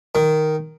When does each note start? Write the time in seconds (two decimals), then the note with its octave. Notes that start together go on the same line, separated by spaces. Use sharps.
0.15 D#3